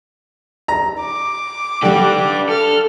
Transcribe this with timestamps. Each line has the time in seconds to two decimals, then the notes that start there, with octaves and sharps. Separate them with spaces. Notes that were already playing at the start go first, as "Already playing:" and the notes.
0.68 A#5
1.00 D6
1.83 D3 G3 D4 G4
2.49 A4 F6